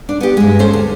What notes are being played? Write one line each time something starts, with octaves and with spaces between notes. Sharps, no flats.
D4
B3 G4
G2 G#3
C#4 A4 C5
D2